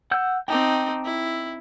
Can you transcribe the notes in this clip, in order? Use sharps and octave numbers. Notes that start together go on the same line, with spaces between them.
F#5 E6 G6
C4 D#4 G5 A5 D6
E4